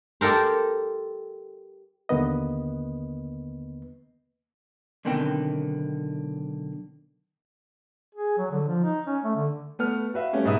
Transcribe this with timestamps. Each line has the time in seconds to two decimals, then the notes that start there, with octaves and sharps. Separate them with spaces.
0.21 G4 A4 A#4 C5
2.09 D#2 D3 A#3 B3 B4 D#5
5.05 B1 D3 D#3 B3 C4 G5
8.15 G#4
8.38 F#3
8.51 D3
8.68 F3
8.84 D#4
9.07 C#4
9.24 A3
9.36 D3
9.79 A3 B3 F6
10.14 F#4 B4 E5 F5
10.33 G3 A3 C#4 G4
10.45 G#2 B2 G#3 B4 E5 D#6